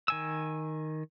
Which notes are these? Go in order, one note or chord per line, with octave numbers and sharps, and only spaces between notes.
D#3 G#5 E6